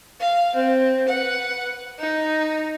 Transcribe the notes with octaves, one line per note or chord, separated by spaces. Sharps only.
F5
C4
B4 F#5
D#4